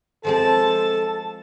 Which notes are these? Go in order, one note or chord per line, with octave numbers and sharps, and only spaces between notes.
F3 G#3 C4 A4 A5